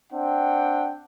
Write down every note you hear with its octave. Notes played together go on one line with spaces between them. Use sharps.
C4 D4 F#5 G5